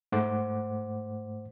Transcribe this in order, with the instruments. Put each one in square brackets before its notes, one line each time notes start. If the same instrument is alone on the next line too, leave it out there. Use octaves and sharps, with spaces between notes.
[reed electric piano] G#2 A3 C5 F#5 D6